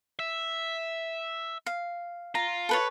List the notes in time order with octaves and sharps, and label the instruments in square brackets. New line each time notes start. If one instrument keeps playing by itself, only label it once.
[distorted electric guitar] E5
[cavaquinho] F5
[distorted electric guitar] F4 [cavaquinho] A#5
[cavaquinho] A4 B4 C#5